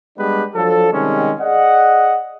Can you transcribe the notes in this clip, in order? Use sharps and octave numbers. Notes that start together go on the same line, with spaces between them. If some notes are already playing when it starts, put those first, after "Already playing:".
G3 G#3 B3 D4 G4 B4
F3 F#3 D4 A4
C3 D#3 G3 G#3 C#4
G#4 D5 D#5 F#5